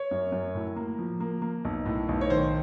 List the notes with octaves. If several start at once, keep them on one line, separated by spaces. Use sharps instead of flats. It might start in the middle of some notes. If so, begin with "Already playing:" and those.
Already playing: C#5
F#2
F#2
A2
A#3
F3
A#3
A#3
B1
A2
B1
C#5
D#3 C5